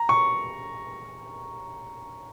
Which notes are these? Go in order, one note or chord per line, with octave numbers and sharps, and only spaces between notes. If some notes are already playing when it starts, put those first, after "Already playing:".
Already playing: A#5
C#6